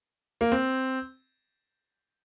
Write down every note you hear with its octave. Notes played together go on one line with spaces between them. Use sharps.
A#3
C4